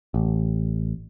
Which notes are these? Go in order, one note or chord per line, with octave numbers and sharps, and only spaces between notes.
A1